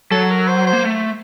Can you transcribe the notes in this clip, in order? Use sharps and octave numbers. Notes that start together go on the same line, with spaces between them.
F#3 A4
A#4
C5
C5
A#3
A3